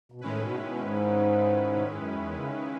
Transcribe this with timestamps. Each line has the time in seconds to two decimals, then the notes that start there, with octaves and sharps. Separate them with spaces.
0.12 B2
0.21 A2 D#3 G#3 C#4 E4 B4
0.40 B2
0.52 A2
0.60 B2
0.79 G#2
1.73 B2
1.80 A2
1.88 G#2
1.95 F#2
2.14 E2
2.33 C#3
2.53 C#3